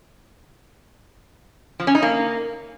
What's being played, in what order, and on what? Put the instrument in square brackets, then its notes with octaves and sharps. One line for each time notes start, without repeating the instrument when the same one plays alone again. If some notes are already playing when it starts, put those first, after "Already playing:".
[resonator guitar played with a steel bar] F3
C#4
D#4
A#3